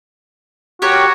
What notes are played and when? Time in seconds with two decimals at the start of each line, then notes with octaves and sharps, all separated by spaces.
0.82 F#4 G4 A#4 C#5